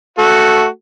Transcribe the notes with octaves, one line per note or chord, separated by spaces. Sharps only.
A3 F#4 A4